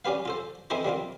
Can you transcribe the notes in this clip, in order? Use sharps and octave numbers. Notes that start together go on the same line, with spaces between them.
G3 C#4 G4 B4 F5
F4 A4 C5
E3 C4 D#4 E4 A4 C5
G3 A#3 C4 F4